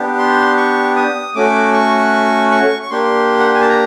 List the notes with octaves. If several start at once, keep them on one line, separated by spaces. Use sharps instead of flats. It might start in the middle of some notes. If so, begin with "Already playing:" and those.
Already playing: B3 D4 G4
C6
C#6
D#6
A3 C#4 F#4 D6
C#6
C#6
C#6
A#3 D4 G4 C6
F#5
G5
G#5
A5
A#5